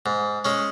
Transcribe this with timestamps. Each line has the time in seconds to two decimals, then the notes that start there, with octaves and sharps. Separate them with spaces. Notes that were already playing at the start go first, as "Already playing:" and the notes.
0.06 G#2
0.45 G#3 C#4